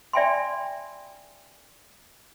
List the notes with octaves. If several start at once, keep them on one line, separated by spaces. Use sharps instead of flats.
D5 E5 G5 G#5 B5 C6